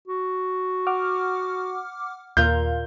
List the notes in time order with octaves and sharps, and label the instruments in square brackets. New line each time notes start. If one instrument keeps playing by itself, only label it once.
[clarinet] F#4
[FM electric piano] F#5 D6 F6
[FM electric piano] D#2 [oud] A#2 F4 A#4 [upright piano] G6